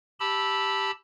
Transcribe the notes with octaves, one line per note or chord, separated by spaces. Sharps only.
G4 A5 B5 E6